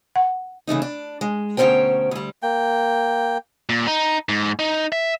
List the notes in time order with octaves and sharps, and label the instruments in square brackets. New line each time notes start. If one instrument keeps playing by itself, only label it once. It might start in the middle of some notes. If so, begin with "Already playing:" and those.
[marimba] F#5
[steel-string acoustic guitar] C#3 E3 A3 D#4
D4
G#3
D2 B2 C#4 A#4 C5 G5
D2 G3
[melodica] A#3 G5
[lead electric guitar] A#2
D#4
G#2
D#4
E5